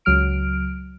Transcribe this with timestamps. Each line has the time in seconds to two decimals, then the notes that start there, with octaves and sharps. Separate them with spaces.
0.05 C#2 F#3 F6 D7